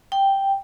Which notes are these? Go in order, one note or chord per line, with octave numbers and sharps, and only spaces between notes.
G5